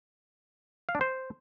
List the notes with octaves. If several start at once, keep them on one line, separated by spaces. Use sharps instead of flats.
F5
D4
C5